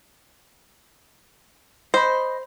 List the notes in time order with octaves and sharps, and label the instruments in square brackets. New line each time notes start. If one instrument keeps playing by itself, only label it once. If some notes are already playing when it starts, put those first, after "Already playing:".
[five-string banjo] C5 [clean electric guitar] D#5 B5